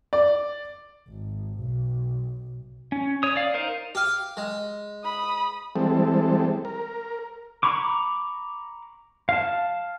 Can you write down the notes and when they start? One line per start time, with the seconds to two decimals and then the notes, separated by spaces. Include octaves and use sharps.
0.13 D5
1.08 G#1
1.59 B1
2.92 C#4
3.23 C#5 D#6
3.36 D5 F5
3.54 D#4 A#4 C5 F5
3.95 G4 F5
4.37 G#3
5.04 B5 D#6
5.76 E3 G3 G#3 C4 A4
6.65 A#4
7.63 A#5 B5 C#6 D6
9.29 F5 A5